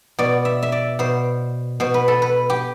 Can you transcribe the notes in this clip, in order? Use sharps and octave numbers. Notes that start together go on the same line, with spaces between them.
B2 D5
E5
E5
D5
B2 C5
B2 C5
B4
A4
B4
G4